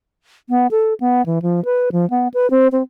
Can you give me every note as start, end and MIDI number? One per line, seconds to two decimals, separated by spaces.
0.49 0.67 59
0.71 0.94 69
1.00 1.25 59
1.26 1.42 52
1.42 1.63 53
1.65 1.89 71
1.92 2.08 53
2.10 2.28 59
2.34 2.49 71
2.50 2.68 60
2.72 2.83 60